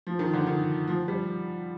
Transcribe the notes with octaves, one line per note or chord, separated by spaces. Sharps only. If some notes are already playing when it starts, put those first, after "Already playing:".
F3
D#3
D3
D#3
F3
G3